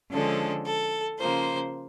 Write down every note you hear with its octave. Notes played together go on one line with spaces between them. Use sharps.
D3 F3 G#3 C#4 A4
A4
C#3 F3 A#3 C5